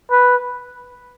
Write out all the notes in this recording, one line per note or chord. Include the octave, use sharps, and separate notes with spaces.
B4